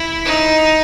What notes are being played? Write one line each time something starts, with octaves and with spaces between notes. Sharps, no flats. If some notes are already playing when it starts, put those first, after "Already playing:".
Already playing: E4
D#4